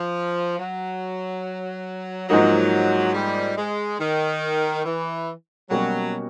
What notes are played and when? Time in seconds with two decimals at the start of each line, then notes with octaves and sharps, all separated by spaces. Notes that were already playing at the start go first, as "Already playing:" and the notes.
Already playing: F3
0.58 F#3
2.29 G#2 F3 F#3 A#3 D#4
3.14 G3
3.57 G#3
3.99 D#3
4.85 E3
5.70 B2 F#3 G3 A#3 C#4 F#4